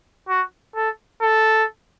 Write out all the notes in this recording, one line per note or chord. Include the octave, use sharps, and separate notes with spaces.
F#4
A4
A4